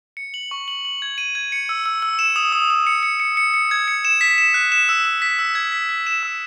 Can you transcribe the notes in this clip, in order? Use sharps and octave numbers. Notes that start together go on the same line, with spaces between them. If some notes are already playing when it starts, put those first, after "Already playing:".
C#7
F#7
C#6
F#7
F#7
G#6
D#7
G#6
C#7
E6
E6
E6
E7
D#6
D#6
D#6
C#7
C#7
C#7
C#7
C#7
G#6
C#7
E7
B6
E7
F#6
E7
E6
E6
B6
E6
G#6
B6
B6
E7
E6